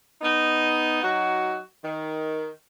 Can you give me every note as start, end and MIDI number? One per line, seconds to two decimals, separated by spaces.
0.21 0.98 59
0.21 0.98 63
1.02 1.60 54
1.02 1.60 63
1.02 1.60 66
1.84 2.52 51